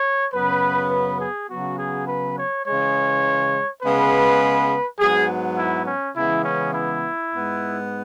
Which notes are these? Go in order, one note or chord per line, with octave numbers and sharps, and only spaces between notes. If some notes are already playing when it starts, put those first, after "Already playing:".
Already playing: C#5
F#2 C#3 F#3 B3 B4
B4
G#4
C#3 F#3 B3 F#4
G#4
B4
C#5
C#3 E3 G#3 C#5
C#3 G#3 B3 B4
G#2 F#3 B3 G#4
E4
C#4
C#3 E3 G#3 B3 E4
C#4
E4
G#2 G#3 B3